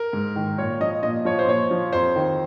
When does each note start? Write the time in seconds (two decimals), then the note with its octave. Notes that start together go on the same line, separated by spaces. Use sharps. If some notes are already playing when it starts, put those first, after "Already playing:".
Already playing: A#4
0.13 G#2
0.36 D#3
0.58 A#2 C#5
0.80 F3 D#5
1.03 A#2 D#5
1.25 F3 C#5
1.39 C5
1.48 A#2 C#5
1.71 F3
1.93 F2 C5
2.16 D#3